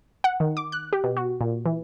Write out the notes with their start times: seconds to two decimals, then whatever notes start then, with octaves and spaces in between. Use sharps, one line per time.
0.24 F#5
0.40 D#3
0.57 D6
0.72 F#6
0.93 G4
1.04 B2
1.17 F#4
1.41 A#2
1.65 E3